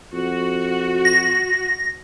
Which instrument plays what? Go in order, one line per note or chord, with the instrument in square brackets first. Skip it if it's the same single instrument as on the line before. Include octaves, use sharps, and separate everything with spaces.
[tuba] F2 [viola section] F#4
[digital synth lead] A#6